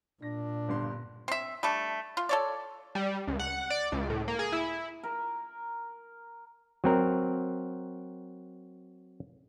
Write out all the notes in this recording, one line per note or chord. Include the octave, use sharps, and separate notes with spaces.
A#2 D4 A#6
G1 G2 C6
C4 E5
G3 A3 D4
F4
A4 C#5 D5
G3
C#2
F#5
D5
C#2
A2
A#3
G#4
E4
A#4
F#3 C4 A#4